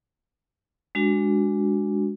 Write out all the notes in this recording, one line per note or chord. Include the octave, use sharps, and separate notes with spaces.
G#3 D4 F#4